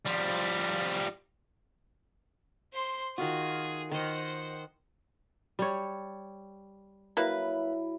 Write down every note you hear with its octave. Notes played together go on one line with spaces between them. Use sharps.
F3 G3
C5 C6
D#3 F4 F#4 G#4
D#3 C5 D#5 F#5
G3 C#5
F#3 A#3 E4 B4